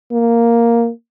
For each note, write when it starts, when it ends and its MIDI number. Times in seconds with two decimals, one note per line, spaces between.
0.12 0.90 58